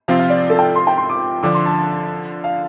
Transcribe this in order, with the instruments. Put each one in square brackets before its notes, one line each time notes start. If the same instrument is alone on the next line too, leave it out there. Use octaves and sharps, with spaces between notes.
[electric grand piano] C3 F3 C4 F4 [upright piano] F5
[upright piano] F5
D5
A4
G5
C6
G5
C6
D6
[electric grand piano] D3 F3 D4 [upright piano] D6
[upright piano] C6
A5
F5